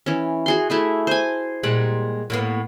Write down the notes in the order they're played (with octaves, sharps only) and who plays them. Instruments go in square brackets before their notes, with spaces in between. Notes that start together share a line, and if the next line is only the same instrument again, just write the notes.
[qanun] E3 C#4
F#4 G#4 C6
A3 E4 G#4
C5 G#5
[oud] A#2 G3 G#3 [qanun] F#5
[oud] A2 A#3 B3